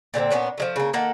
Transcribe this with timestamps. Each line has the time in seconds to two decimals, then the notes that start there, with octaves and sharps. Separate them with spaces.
0.14 A#2 D3 A3 C4
0.30 A#2 B3 C#4 D4
0.58 F3 G#3 A3
0.76 C#3 A#3
0.93 D#3 A#3 A4 F#5